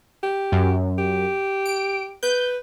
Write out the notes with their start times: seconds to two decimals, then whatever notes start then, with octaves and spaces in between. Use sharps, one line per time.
0.23 G4
0.52 F#2
0.98 G4
1.66 D7
2.23 B4 G6